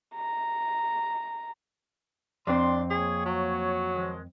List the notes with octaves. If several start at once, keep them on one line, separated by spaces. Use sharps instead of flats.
A#5
F2 C4 D4 C6
A#3 G#4 C#5
F#3
D#3 F3 G#3